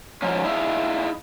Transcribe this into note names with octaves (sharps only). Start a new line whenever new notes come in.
G#2 F3 F#3 C#4
D#4 E4 G#4 E5 F5